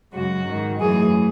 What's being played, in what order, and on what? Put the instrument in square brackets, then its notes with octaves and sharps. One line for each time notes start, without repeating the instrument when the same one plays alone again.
[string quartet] F#2 C#3 G#3 F#4
G#2 D#3 G#3
F#2 E3 A3 G#4